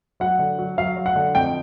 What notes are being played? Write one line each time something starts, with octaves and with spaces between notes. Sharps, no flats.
F#3 F#5
D3
F#3
F#3 F5
F#3
F#5
D3
F2 G5